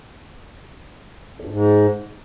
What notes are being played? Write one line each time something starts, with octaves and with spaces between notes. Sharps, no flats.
E2
G2
G#2